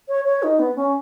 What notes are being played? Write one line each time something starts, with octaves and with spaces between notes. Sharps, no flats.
C#5
C#5
D#4
B3
C#4